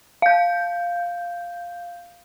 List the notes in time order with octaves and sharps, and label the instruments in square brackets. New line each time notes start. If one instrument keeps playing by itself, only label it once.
[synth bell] F5 G6